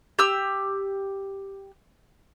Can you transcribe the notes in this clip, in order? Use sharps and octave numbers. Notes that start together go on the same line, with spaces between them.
G4 E6